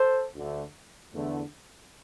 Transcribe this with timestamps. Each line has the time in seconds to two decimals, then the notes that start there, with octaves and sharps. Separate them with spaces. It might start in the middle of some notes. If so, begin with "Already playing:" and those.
Already playing: A4 C5
0.35 D2 D3 A3
1.14 E2 D3 A3